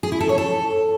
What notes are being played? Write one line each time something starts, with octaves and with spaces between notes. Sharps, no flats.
G#4
E4
A4
C#5
A4